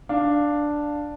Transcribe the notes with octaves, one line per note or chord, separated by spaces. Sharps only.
D4 F5